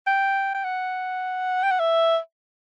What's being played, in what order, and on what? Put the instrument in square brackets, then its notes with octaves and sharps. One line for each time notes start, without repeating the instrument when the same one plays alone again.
[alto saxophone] G5
G5
F#5
G5
F#5
E5